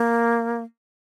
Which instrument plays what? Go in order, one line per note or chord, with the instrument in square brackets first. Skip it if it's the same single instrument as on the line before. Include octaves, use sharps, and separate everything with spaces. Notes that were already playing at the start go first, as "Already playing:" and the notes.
Already playing: [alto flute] A#3